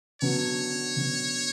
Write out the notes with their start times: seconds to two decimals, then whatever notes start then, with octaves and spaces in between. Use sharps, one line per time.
0.21 D3 F#3 B3 F#4 C#5
0.96 D3 F#3 B3 F#4